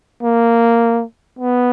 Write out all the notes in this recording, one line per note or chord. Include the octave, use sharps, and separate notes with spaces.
A#3
B3